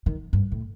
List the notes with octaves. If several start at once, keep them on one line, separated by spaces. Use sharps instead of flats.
D#3
G2
A2